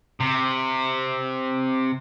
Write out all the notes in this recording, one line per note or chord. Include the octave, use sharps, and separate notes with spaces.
C3